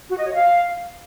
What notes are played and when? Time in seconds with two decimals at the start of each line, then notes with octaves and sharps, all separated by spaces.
0.09 F#4
0.17 D#5
0.26 C#5
0.34 F5